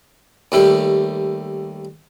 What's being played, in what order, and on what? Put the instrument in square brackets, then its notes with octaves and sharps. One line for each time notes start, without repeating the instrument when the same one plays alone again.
[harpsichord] D#2 G3 A3 G4